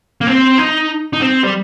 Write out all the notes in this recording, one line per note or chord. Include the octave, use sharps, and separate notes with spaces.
A#3
C4
D#4
D#4
C4
G3